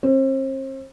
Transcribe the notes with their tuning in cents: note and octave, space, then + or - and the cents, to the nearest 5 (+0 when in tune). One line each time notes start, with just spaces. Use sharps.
C4 +40